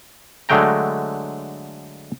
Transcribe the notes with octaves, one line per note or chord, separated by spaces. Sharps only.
D3 F#3 G#3 A3 G5 A#5